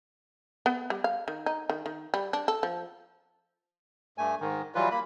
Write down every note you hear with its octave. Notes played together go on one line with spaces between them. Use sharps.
B3
G3
F5
D#3
D#4
D#3
D#3
G3
D4
A4
F3
G2 A3 G#5
G#2 D#3
E3 F#3 G3 F4 B4
A#3 B5